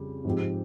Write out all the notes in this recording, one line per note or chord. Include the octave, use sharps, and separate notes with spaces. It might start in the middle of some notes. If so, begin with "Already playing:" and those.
Already playing: F2 C#3 G3
G#2 F3 C4 G4